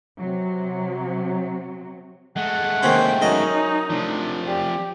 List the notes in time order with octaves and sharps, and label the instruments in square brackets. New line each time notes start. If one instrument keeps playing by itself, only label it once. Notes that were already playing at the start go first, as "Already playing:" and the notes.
[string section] C3 F#3
[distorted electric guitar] G#3 A3 [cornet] F#5
[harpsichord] D#2 C3 C#4 [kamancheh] C5 G5
[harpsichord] F#2 D#5 [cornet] C#4 [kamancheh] D#4
[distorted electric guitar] C3 F3 [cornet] D4
[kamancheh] G4 [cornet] D5